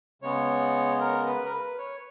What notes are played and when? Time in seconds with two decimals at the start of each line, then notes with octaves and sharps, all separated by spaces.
0.22 C#3 G#3 B3 C#5
1.00 A#4
1.27 B4
1.45 A#4
1.53 B4
1.79 C#5